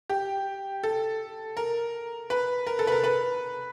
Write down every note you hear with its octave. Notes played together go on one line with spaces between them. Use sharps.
G4
A4
A#4
B4
A#4
A4
B4
A#4
B4